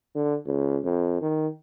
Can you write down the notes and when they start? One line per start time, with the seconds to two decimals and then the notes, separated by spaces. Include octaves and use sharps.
0.15 D3
0.46 C#2
0.85 F2
1.21 D#3